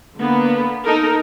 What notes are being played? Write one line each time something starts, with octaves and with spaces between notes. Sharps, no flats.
D3 A#3 B3
D#4 A4 A#4